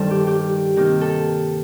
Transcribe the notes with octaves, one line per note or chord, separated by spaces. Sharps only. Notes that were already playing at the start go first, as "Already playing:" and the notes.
Already playing: G2 D#3 G3 A4 C5
G4
G4
C3 D#3 A#3 D#4 G4
A4